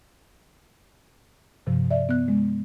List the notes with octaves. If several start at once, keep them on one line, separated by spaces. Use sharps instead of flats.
G2 C3 F3
D5 E5
B3 F#6
G#3